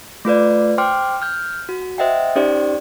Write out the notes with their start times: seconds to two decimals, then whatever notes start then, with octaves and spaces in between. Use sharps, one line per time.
0.25 A3 F4 B4 D5
0.78 C5 G5 C6 D6 F6
1.22 F6 G6
1.69 F#4
1.98 C5 D#5 E5 F#5 G5
2.36 C#4 D#4 G4 C5 D5